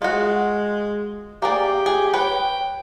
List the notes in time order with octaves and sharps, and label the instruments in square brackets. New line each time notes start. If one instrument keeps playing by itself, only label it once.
[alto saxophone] G#3 [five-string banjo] F4 F#4
[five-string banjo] A#3 G#4 D5 [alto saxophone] G4
[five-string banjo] G#4
[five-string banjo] B4 C#5 [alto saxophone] G5